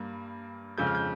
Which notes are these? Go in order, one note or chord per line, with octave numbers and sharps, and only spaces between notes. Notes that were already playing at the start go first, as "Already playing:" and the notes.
Already playing: G2 G3 A#3
F2 C#3 G#3 G6
F6
G6